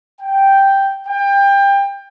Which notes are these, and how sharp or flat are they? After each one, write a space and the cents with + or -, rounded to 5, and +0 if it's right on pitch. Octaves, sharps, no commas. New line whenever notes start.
G5 +0
G5 +25